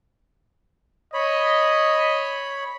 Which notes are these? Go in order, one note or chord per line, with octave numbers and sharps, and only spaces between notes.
C#5 D#5 B5